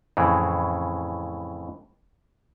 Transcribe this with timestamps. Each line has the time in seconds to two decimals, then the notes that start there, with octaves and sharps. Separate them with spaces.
0.17 F2 A2 C#3 E3